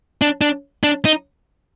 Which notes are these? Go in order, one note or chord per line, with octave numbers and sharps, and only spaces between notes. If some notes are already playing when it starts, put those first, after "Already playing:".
D4
D4
D4
D#4